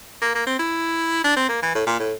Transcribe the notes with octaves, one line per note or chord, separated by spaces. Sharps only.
A#3
A#3
C4
E4
D4
C4
A#3
E3
A2
A#2
A2